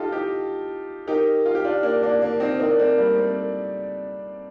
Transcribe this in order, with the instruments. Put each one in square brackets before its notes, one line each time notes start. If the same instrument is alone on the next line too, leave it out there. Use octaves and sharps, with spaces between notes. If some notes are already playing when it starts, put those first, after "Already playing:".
Already playing: [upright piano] D#4 F4 G4 A4
D#4 G4
[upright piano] D#4 G4 [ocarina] A#4
[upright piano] F4
G4
D4 F4
A#3 D4
A#3 D4
A#3 D4
C4 D#4
[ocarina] C5
[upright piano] C4 D#4 [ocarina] A#4
[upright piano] D4
A3 C4
G3 A#3
A3 C4